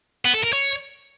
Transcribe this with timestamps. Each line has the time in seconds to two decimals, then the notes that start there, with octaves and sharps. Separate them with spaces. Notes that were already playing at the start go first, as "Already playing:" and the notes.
0.25 B3
0.34 A4
0.44 A#4
0.53 C#5